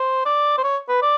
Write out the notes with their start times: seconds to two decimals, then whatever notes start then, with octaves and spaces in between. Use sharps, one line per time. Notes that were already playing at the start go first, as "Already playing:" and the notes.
Already playing: C5
0.26 D5
0.58 C5
0.64 C#5
0.89 B4
1.02 D5